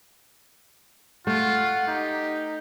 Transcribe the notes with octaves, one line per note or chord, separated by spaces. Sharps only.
A3 F4 F#5
D#4 G4